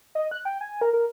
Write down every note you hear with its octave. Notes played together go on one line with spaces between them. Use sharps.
D#5
F#6
G5
G#5
A#4
A#4